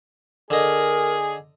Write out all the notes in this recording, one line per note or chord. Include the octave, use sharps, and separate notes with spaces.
D3 G#4 A#4 D#5